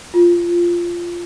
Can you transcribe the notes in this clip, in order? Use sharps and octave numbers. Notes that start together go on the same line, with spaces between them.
F4